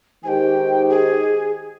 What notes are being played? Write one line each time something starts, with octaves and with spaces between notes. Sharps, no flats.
D#3 G#3 D#4 G4 C5 G5 G#5
G#4